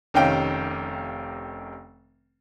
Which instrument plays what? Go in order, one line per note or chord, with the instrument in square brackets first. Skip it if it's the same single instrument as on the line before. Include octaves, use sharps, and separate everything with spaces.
[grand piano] F1 C3 D#3 C#4 F5 G5